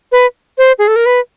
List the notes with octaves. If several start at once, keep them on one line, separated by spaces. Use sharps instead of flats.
B4
C5
G#4
A4
A#4
B4